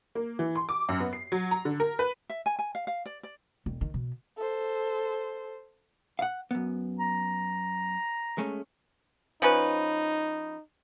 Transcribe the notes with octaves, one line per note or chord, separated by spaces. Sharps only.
A#3
E3
C6
D6
F#2
B3
C7
F#3
A#5
D3
A#4
B4
E5
G#5
G#5
F5
F5
D5
D5
E1
D#3
B2
A4 C5
F5 F#5
F#2 B3
A#5
G#3 A3 C#4
F3 C#4 D#4 B4